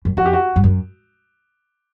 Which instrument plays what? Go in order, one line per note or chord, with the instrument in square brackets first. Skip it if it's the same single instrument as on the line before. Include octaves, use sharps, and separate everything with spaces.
[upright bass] F#2
[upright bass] F2 [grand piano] F#4
[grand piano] G4
F#4
[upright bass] G2
F#2